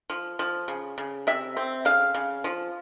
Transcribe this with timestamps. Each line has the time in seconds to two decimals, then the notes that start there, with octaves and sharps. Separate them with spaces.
0.10 F3
0.39 F3
0.68 C#3
0.98 C#3
1.27 C3 E5
1.57 C4
1.85 C#3 F5
2.14 C#3
2.44 F3